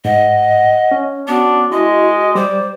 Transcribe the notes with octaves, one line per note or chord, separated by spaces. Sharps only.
G#2 D#5 F#5
C#4
B3 D4 F#4
G#3 E4 D#5
G3 C5 D5